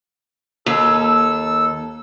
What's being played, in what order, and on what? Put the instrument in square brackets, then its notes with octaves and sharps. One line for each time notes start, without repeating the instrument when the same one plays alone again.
[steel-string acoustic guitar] D#2 [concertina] A4 E6